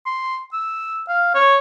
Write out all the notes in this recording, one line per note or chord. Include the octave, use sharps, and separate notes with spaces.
C6
E6
F5
C#5